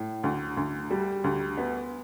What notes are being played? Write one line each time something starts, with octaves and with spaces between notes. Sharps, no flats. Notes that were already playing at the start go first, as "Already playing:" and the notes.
Already playing: A2
D2
D2
G3
D2
B3